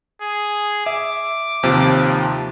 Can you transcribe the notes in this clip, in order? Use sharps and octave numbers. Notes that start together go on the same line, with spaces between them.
G#4
E5 D6
D#2 C3 F3